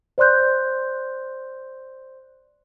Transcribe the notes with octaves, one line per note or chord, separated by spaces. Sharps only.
C5 D5 C6 F#6 G6